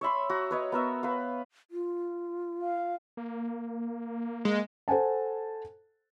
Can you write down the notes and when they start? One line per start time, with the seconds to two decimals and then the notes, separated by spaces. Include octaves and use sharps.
0.01 C#5 E5 B5 C6
0.30 F#4 A#5
0.51 B4 C#5 D#5
0.72 B3 A#4 E5
1.03 B4 F5
1.71 F4
2.61 F5
3.17 A#3
4.45 G#3
4.88 A4 C5 F#5 G#5 A5